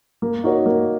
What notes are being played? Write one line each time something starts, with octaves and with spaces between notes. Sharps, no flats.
A#3
D#4 F#4 A#4 C#5
A#3